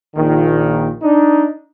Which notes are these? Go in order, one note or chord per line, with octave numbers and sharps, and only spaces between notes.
A#1 A#2 D#3
D4 D#4